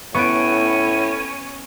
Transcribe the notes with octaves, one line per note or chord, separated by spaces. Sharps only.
A2 B3 C#4 C#6 D7